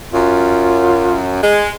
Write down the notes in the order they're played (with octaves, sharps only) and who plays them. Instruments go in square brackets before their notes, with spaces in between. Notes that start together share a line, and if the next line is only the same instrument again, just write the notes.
[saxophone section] F#2 [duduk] F4
[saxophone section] G#3